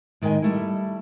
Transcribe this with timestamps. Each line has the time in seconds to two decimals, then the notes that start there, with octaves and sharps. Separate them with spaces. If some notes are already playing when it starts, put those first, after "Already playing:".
0.22 A2 D#3 G#3 D#5 G5 G#5
0.42 G3 A3 E4